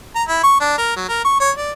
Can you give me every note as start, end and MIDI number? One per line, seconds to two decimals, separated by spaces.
0.15 0.23 82
0.28 0.43 64
0.43 0.58 85
0.61 0.74 62
0.78 0.95 70
0.96 1.05 54
1.09 1.22 70
1.25 1.39 85
1.40 1.51 73
1.57 1.72 74